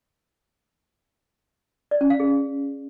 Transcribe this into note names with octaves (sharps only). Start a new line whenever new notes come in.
D5
C#4
F5
G#4